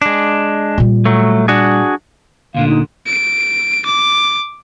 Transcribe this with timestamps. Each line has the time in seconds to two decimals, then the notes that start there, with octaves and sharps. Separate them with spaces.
0.02 G#3 D4
0.78 A#2 G3
1.05 F#3 A3
1.48 D4 F#4 G#4
2.54 D2 A#2 D3 F5
2.68 D#4
3.06 D7
3.86 D6